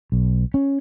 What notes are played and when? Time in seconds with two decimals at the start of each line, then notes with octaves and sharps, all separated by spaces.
0.12 B1
0.54 C#4